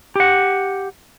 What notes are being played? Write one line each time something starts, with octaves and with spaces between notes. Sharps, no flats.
G4 F#5